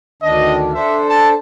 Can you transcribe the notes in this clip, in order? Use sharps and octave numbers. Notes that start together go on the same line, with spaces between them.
D2 D#3 D4 D#5
D4 A4 C5 E5
A5